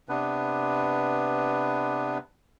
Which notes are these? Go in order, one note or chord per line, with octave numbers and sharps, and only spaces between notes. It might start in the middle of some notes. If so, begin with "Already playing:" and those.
C3 B3 D4 B4